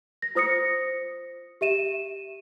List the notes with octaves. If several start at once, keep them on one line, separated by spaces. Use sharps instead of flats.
A#6
F4 C5 D#6 A#6 C#7
G4 E5 D#7 E7